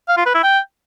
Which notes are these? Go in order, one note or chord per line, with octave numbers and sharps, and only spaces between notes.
F5
F4
B4
E4
G5